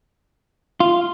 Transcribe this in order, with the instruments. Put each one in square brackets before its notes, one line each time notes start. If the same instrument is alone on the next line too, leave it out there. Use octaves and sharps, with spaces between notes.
[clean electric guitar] F4